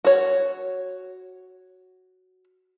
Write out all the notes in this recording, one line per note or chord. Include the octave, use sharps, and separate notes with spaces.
F#4 C#5